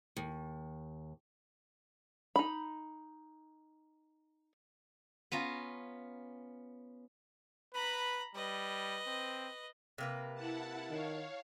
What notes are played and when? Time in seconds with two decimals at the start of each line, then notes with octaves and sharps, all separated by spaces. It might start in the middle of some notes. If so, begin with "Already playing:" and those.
0.16 D#2
2.36 D#4 B5
5.32 B3 C#4 F4 A#5
7.74 B4 A#5 B5
8.35 G3 B4 D#5
9.07 C4
9.98 C3 A#3 B4
10.34 E4 F#5 A5
10.90 D#3 C#5 F5